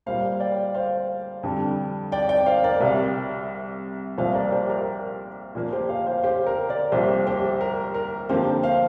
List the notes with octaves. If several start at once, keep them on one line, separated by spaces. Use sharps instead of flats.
A#2 G3 A#3 C5 F5
D5 G5
C5 F5
F2 D3 G3
D5 G5
D5 G5
C5 F5
A#4 D5
C2 C3 G3
C2 A#2 F3 C5 F5
A#4 D5
G4 C5
A#4
A#2 F3 A#3 A#4
G4 C5
C5 F5
C5 F5
G4 C5
A#4
A#4 D5
C2 A#2 F3 G4 C5
G4 C5
A#4
A#4
F2 D3 F3 A#3 G4 C5
C5 F5